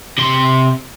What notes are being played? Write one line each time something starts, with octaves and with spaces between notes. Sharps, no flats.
C3 C6